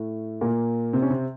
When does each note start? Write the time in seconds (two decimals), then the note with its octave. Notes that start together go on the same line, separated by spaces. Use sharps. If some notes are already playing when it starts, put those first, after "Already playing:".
Already playing: A2 A3
0.41 A#2 A#3
0.93 C3 C4
1.02 C#4
1.10 C3 C4